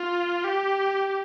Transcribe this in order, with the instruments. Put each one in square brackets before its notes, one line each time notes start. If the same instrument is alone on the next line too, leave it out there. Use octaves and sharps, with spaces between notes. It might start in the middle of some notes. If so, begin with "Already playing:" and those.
Already playing: [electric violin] F4
G4